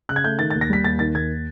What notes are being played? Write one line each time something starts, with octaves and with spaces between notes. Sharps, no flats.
C#3 F#6
G#6
A3 G6
D#3 A6
A6
D#2
A#6
G3 B6
D#2 A6
D#3 A6
D#2 G#6